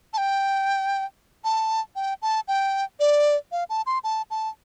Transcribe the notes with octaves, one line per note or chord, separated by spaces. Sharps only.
A5
G5
A5
G5
A5
G5
D5
F5
A5
C6
A5
A5